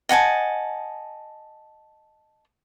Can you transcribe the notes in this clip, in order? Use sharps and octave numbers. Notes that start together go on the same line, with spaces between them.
D#5 F#5 G#5 A5